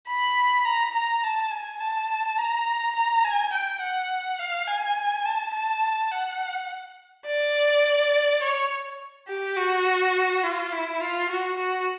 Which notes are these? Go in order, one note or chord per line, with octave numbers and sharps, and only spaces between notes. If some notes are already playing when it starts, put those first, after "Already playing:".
B5
A#5
A#5
A5
G#5
A5
A#5
A#5
G#5
G5
F#5
F5
G#5
A5
A5
F#5
D5
C#5
G4
F#4
F4
E4
F4
F#4
F#4